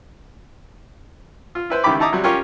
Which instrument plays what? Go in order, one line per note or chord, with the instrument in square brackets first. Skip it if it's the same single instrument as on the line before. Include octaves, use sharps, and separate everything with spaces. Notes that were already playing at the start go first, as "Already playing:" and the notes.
[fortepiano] F4
E4 B4 C5
C#2 D#3 E4 G4 B5 D6
D#4 E4 A5 A#5 D6 D#6
C3 F#3 G3
C#4 F4 G4 A#4 C#6